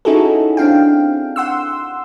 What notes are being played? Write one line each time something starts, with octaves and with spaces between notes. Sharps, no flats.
C#4 D#4 E4 F#4 G#4 A4
C4 D4 F5 G5
F#5 C6 E6